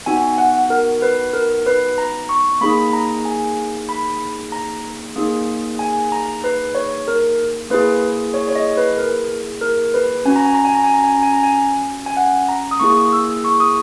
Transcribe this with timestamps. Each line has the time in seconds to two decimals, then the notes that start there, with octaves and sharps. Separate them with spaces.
0.06 B3 D#4 F#4 G#5
0.38 F#5
0.70 A#4
1.02 B4
1.34 A#4
1.66 B4
1.98 A#5
2.29 C#6
2.61 A#3 D#4 G#4 B5
2.93 A#5
3.25 G#5
3.89 B5
4.52 A#5
5.16 A#3 D#4 G#4
5.79 G#5
6.12 A#5
6.44 B4
6.75 C#5
7.08 A#4
7.70 A#3 E4 G#4 B4
8.34 C#5
8.48 C#5
8.55 D#5
8.77 B4
8.98 A#4
9.61 A#4
9.94 B4
10.25 C#4 F#4 G#5
10.36 A#5
10.45 G#5
10.54 A#5
10.65 G#5
10.75 A#5
10.84 G#5
10.94 A#5
11.04 G#5
11.14 A#5
11.23 G#5
11.33 A#5
11.43 G#5
12.06 G#5
12.17 F#5
12.49 A#5
12.71 D#6
12.80 A#3 E4 G#4 C#6
13.13 E6
13.44 C#6
13.60 D#6